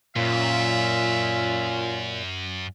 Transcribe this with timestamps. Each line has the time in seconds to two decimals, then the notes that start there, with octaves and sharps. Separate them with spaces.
0.16 F#2 A#2 C#4 F4 E5